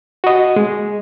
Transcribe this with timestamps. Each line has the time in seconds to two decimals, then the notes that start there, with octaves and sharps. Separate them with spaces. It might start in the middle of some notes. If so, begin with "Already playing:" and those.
0.24 F#4 D#5
0.56 G#3